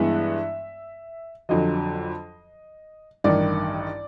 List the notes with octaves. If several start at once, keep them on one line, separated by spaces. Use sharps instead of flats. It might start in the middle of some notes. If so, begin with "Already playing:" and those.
Already playing: G2 E3 G#3 B3 E5
F2 D3 F#3 D#5
A1 G2 D#3 D5